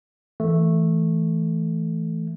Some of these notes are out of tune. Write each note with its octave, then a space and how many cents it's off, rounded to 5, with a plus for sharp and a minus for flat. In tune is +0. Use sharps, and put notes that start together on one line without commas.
E3 +0 A3 +0